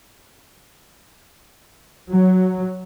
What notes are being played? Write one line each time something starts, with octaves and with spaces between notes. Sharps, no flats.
F#3